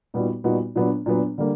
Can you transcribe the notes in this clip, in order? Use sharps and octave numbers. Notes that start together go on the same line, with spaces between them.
A#2 G3 B3 D#4 F#4
A#2 G3 B3 D#4 F#4
A#2 F#3 B3 D4
A#2 F#3 B3 D4
D3 G3 A#3